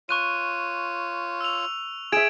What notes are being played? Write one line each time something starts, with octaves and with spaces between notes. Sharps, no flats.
F4 C#5 C#6 F#6 D#7
E6 F7
G#4 E5 G#6 D7 E7